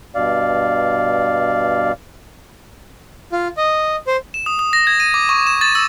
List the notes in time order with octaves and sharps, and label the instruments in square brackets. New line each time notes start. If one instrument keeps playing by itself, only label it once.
[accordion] G2 B2 D5 F5
[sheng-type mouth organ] F4
D#5
C5
[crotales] E7
D#6
D#6
A#6
G#6
D#7
D6
C#6
E7
A6
E6